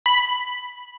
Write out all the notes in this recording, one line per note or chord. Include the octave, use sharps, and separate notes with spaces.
B5